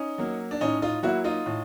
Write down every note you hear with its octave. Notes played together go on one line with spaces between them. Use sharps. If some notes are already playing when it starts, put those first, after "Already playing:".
Already playing: C#4 D#4
F#3 A#3
D4
A2 C#4 D#4
D#4 F4
F#3 A#3 E4 F#4
D#4 F4
A2